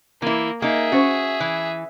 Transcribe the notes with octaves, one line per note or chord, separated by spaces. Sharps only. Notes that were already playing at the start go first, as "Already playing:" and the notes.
E3 A#3 E4
A#3 D#4 G#4 E5
C#4 F#4 C5
E3